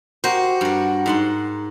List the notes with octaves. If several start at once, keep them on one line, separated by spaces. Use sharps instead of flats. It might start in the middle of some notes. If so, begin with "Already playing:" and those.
F#4 G4 A#4 C5
G2 A#4
G#2 F#5 C6